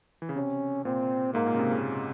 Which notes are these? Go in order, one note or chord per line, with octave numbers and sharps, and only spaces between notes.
E3
C#3
C3 C#4
A#2 C4
G#2 A#3
A#2
C#3
C3
C#3